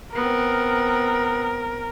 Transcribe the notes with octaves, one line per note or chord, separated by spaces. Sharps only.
B3 C4 A#4